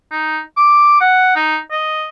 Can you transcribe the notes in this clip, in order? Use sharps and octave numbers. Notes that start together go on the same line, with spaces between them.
D#4
D6
F#5
D#4
D#5